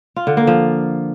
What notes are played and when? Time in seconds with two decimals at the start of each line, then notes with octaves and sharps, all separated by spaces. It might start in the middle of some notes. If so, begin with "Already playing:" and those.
0.16 F4
0.27 D3
0.37 A#3
0.47 F3